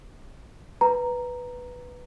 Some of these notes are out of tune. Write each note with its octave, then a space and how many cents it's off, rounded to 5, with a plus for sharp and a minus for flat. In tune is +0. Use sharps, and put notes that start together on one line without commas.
B4 +0 A#5 +0